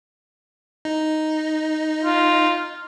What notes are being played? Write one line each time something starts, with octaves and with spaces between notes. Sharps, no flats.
D#4
F4